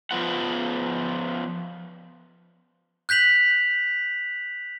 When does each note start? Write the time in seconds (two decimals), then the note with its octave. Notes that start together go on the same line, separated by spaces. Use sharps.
0.11 F3 B3 F4 F#5
3.09 F#6 G6 B6 F7 F#7